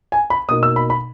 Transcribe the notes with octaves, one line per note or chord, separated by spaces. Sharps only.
G#5
B5
B2 A#3 D#4 D#6
E6
B5
B5